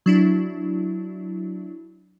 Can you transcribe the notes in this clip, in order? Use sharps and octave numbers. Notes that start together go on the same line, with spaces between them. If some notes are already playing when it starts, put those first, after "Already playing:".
F#3 D4 E4